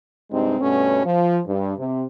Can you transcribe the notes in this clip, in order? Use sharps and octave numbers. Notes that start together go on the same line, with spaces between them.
G2 C3 G#3 C4 D#4
G2 B2 A3 B3 C#4
F3
G2
C3